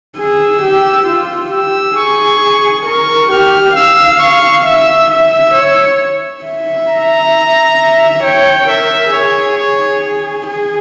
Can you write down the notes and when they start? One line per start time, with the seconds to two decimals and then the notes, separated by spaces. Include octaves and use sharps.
0.17 G#4 E6
0.62 G4
1.07 F4
1.51 G4 E6
1.96 G#4 C#6
2.86 A#4 C#6
3.30 G4 F6
3.75 F5 E6
4.20 C#6
4.65 E5 E6
5.10 E5 E6
5.54 C#5
6.44 E5
6.89 A#5
7.78 E5
8.23 C#5 G5
8.68 A#4 E5
9.12 G#4 C#5
9.58 C#5
10.47 G#4